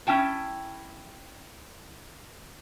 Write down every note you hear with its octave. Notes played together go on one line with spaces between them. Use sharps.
C#4 E4 G5 A5